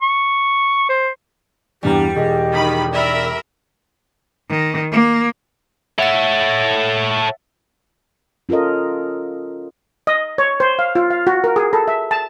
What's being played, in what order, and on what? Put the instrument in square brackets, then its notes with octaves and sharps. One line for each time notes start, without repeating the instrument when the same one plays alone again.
[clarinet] C#6
C5
[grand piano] E2 G2 A#5 [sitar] G3 [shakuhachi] G4
[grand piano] E1 G#4 [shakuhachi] D#5
[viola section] D#3 B5
[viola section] A#4 E5 B5 [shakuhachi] D5
[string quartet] D#3
A#3
[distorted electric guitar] A4 C#5 [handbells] E5 F#5 A6
[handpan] C#4 F4 A4 A#4 D#5
[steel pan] D#5
C#5
C5
F5
F4
F5
F#4
A#4
G#4
A4
E5
A5